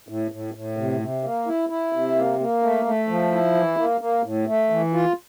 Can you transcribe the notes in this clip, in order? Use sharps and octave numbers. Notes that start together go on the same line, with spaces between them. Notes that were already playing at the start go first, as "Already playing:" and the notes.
A2
A2
A2
C3
C3
A#3
E4
E4
C3
A#3
A#3
A3
A3
F3
E4
E3
A#3
A#3
A2
A3
E3
F4